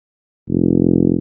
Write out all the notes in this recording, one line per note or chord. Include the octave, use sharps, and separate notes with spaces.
F1